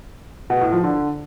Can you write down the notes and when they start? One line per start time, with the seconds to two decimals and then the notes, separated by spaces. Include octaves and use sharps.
0.50 B2
0.61 A2
0.72 F3
0.84 D3